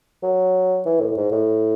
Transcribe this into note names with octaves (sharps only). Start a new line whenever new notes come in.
F#3
E3
A2
A2
G#2
A2